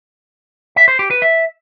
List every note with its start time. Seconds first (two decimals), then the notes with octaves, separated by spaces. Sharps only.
0.76 E5
0.88 C5
0.99 G4
1.11 B4
1.22 E5